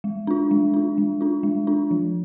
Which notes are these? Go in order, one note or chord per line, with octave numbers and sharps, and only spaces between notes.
G#3
D4 F4
G#3
D4 F4
G#3
D4 F4
G#3
D4 F4
F3